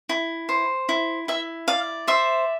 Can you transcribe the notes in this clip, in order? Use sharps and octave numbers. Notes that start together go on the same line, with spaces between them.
E4
C5
E4
E4 E5
D5 F5
C5 E5